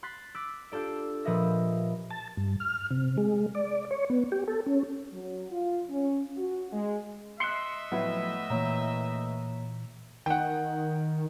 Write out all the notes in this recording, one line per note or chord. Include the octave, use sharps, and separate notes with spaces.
C6 F#6 A6 B6
D6 E6 F#6 B6
D4 F4 G4 A4 D5
A#2 F3 B4 D#5 E5 A#6
A5
G2
F6
C3
G#3
D5
C#5
B3
G4
A4
C#4
F#3
F4
C#4
F#4
G#3
D#5 E5 C6 F#6 C7 C#7 G7
A2 F3 F#3 A3 B3 E4 F#5
A#2 E3 A#3 C#5 A#5
D#3 F#5 G5